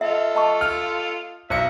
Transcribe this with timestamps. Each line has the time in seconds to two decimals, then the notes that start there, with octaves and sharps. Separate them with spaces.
0.01 F4 A4 D#5 E5
0.35 D#5 A5 C#6
0.61 F6
1.50 B1 D#5 E5 C#7